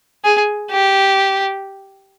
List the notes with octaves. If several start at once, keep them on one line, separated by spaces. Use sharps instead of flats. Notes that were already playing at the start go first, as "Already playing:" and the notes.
G#4
G4